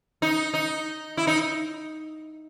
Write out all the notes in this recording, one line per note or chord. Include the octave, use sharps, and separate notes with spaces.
D#4
D#4
E4
D#4